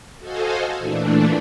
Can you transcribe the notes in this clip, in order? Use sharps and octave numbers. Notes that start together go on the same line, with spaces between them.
F#4 A4 C5 D#5 F5 G#5
A#2 E3 A3 D4